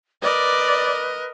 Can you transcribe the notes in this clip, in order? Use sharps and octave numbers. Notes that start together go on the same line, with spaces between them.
A#4 B4 D5 D#5